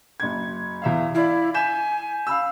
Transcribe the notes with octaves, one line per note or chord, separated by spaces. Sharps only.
F#1 G#6
E2 E5 F5
E4 D5 F5
G#5 G6 B6 E7
F5 B5 E6